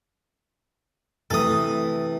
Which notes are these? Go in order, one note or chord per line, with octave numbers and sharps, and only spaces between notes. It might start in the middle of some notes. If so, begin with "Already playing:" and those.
C3 E3 A3 A4 D#6